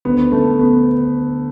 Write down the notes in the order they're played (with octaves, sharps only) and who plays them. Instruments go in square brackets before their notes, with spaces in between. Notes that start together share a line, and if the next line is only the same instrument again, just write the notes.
[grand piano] D2 D3 B3
A3
B3